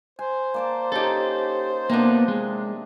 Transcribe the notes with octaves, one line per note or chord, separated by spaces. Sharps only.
C5 G#5
A#3 D5 A5
C#4 D#4 G4 A4
C3 F3 A#3 B3 D4
G#3